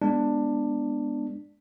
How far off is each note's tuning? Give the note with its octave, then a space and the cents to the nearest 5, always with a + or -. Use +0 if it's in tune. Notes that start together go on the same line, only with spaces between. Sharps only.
G#3 +0 B3 +0 D4 +10